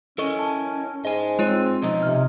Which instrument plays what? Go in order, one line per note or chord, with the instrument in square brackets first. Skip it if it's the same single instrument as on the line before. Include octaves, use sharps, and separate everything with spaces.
[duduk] C#4 [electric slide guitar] E4 A#4 D#5 [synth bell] A4 C#6
[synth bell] A5
[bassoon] G#2 [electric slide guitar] D#5 G#5
[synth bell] G#3 F4 C#5 [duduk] C4
[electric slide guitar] B2 F3 C#4 [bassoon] D#4
[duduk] C3 [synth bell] F6